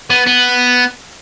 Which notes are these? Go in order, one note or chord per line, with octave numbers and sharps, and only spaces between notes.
B3
B3